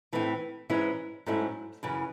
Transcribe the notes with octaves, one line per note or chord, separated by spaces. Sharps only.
A2 E3 A3 C4 E4
G#2 E3 G#3 C#4 E4
G#2 F#3 A3 C#4 E4
F#2 C#3 E3